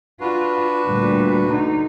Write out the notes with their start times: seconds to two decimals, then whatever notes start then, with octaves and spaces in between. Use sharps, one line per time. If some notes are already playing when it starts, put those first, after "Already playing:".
0.20 D4 F4 F#4 B4
0.86 D2 A#2 G3
1.48 D3 D#4